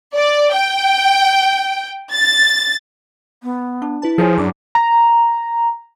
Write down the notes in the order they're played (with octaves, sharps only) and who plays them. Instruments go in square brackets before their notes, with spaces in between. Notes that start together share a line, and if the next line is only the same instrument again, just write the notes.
[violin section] D5
G5
A6
[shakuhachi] B3
[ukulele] D4
[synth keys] E4 B4 A5
[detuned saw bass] F3 [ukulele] G#4 C#5 G#5 [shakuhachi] C5
[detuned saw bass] F#2 [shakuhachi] D4 [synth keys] D6
[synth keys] A#5